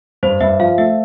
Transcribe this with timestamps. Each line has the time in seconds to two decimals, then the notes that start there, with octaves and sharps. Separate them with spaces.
0.23 G2 C5
0.41 G2 E5
0.60 F3 F5
0.78 A3 E5